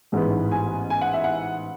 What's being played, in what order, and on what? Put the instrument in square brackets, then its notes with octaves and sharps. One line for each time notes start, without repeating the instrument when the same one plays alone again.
[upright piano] A1 G#2 E3 G#3 B3
G#5
G#5
F#5
E5
F#5